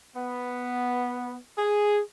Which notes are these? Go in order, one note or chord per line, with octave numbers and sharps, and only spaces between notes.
B3
G#4